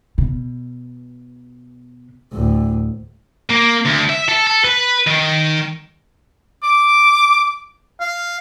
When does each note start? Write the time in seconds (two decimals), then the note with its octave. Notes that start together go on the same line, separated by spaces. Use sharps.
0.18 B2
2.33 D2 A2
3.50 A#3
3.86 D2
4.10 E5
4.29 A4
4.47 A4
4.64 B4
5.07 D#3
6.63 D6
8.00 F5